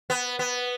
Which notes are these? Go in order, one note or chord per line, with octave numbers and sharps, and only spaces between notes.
B3
B3